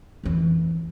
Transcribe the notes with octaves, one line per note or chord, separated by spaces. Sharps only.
F2 E3